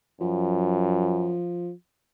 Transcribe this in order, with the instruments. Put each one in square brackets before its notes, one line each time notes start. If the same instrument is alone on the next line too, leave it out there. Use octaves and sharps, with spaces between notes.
[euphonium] F#2 [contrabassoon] F3